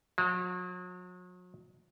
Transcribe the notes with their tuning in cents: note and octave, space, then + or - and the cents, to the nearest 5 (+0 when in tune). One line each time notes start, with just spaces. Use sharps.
F#3 -40